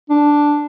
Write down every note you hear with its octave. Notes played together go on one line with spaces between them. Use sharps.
D4